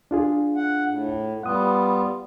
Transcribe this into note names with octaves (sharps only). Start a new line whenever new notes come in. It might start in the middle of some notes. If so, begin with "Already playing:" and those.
D4 F4 G#4
F#5
A2
G3 B3 F4 F#5 D#6